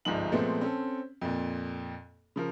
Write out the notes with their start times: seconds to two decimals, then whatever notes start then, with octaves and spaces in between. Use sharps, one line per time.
0.05 G1 C2 G#2 F3 D#4 F#7
0.32 A#2 F3 G#3 A3 B3 C4
0.61 C4 C#4 A4
1.21 F2 A#2
2.36 C#3 F3 A#4